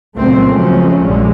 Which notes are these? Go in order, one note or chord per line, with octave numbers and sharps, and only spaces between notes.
C#2 A#2 F#3 A3 C4
C#3 F3 F#3 G#3 A3 C#4
A#1 G2 D3 G#3